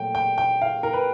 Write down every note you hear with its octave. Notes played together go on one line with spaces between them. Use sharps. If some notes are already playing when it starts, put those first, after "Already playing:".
Already playing: A#2 F#3 A3 G5
G5
G5
F5
A#4
B4